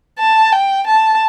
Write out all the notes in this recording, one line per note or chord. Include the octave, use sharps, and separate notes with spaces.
A5
G5
A5